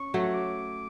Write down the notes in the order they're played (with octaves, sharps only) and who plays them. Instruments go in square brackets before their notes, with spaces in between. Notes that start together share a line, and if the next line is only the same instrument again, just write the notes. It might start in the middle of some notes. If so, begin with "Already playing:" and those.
Already playing: [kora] C#4 [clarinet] C#6
[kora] F#3 A3
[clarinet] D6